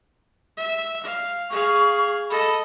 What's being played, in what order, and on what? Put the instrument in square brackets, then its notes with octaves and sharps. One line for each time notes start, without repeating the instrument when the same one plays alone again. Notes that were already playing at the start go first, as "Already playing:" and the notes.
[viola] E5
F5
[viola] G#4 F5 [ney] C#6
[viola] A4 D#5 [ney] B5